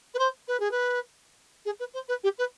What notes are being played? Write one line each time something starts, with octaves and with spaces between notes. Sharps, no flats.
B4
C5
B4
G#4
B4
G#4
B4
C5
B4
G4
B4